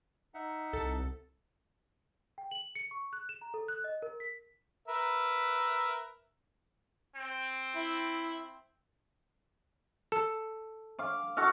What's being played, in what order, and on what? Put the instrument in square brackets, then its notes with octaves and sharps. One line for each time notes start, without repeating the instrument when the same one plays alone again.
[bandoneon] D#4 E5 F#5
[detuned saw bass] C2 [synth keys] A4
[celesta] G5
F#7
C#7
C#6
F#6
E7
A#5
A4
F#6
D#5
A#4
B6
[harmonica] A#4 B4 E5
[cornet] C4
[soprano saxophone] E4
[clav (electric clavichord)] A4
[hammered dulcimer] F5 D6
F#4 A4 F5